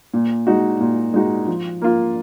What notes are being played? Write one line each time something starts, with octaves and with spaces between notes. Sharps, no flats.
A#2
G#3 D#4 F#4
A#2
G#3 D#4 F#4
F3
A#3 F4